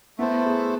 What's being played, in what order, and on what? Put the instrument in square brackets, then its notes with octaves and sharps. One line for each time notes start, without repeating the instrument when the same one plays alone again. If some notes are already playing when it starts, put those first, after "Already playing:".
[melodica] A3 E4 A4 C5 [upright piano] B3
[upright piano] G#4